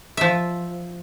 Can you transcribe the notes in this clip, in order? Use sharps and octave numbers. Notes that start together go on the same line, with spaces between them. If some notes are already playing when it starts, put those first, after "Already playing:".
F3 E5